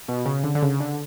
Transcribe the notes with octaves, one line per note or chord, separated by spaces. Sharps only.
B2
C#3
D3
D3
C#3
D3